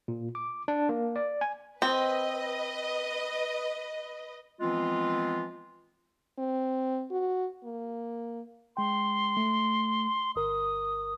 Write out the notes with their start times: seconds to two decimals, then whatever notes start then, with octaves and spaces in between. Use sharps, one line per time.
0.08 A#2
0.35 D6
0.68 D4
0.89 A#3
1.16 D5
1.41 G#5
1.82 C4 B4 D#5
4.60 E3 F3 G#3 B3 C4 F4
6.38 C4
7.11 F#4
7.64 A#3
8.77 G#3 G5 C6
9.37 A3
10.36 G1 A#4 D#6